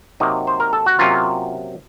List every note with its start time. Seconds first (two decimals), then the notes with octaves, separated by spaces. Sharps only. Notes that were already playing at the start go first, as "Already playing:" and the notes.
0.20 C3 F#3 A#3 D#4
0.47 C5
0.60 A#4
0.73 A4
0.86 F#4
0.99 C3 F#3 A#3 C#4 F4